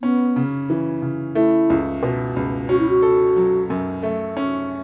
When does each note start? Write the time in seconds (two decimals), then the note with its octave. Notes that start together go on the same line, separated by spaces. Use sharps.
0.02 B3 C#4
0.36 C#3
0.70 E3
1.02 C#3
1.35 A3 E4
1.70 C#2
2.03 B2
2.36 C#2
2.69 C#4 F#4
2.79 E4
2.89 F#4
3.02 A4
3.36 F#3
3.70 F#2
4.03 A3
4.37 C#4